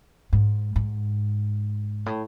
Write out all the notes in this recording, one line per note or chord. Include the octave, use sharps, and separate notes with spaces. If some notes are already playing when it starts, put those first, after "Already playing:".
G#2
G#2
A2